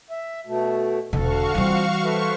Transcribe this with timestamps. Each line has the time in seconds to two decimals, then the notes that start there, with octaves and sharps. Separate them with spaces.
0.10 E5
0.46 B2 A3
1.13 E1 D2 D3 F#4 A4 F5 C#6
1.55 E3 F3 G3 C4
2.04 A4 B4 C5 E5 C#6 F6